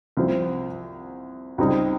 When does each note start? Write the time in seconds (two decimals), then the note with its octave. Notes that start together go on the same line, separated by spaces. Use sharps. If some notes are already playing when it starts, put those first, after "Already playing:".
0.17 C2 C3 F3 C4
1.58 C#2 C3 G3 C4 D#4